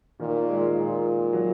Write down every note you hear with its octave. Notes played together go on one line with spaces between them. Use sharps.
A#2 D#3
G#3
A#2
F#3